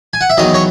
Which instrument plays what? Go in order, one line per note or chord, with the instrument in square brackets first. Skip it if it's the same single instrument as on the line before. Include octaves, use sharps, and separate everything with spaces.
[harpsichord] G#5
F#5
E5
E2 D#3 F#3 D#5
C#5